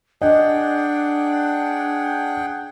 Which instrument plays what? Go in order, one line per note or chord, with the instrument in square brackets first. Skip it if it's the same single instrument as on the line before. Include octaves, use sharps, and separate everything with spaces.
[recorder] D4 [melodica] G#4 F#5 G5 [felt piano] D#5